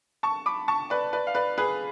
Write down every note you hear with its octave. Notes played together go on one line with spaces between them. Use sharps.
A5 C#6
B5 D6
A5 C#6
B4 D5
B4 D5
F5
B4 D5
G#4 B4